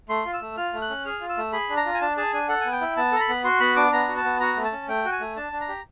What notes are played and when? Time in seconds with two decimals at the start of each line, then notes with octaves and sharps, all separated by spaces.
0.09 A3 C6
0.25 F4
0.33 E6
0.41 A3
0.57 F4 F6
0.73 A3
0.82 F#6
0.90 C#4
1.05 G#4 F6
1.21 F4
1.29 E6
1.37 A3
1.53 G#4 B5
1.69 D4
1.77 A#5
1.86 F4
1.94 G#5
2.01 D4 A5
2.17 G#4 A5
2.33 D4 G#5
2.48 A4 F#5
2.61 B3 G#5
2.72 G5
2.81 E4
2.97 B3 A5
3.12 A4 A#5
3.20 B5
3.29 B3
3.44 F#4 C6
3.60 B3 B5
3.76 D4 D6
3.92 B3 A#5
4.08 F#4
4.17 A5
4.24 B3
4.40 F#4 A#5
4.56 A3
4.65 A5
4.72 C#4
4.88 A3 G5
5.05 F#4
5.12 G#5
5.20 A3
5.36 D4 A5
5.53 D4
5.61 A#5
5.69 G4